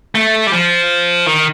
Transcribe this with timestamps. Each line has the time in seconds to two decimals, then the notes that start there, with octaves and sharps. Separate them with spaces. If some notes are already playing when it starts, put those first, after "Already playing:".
0.15 A3
0.47 G3
0.52 F3
1.26 D#3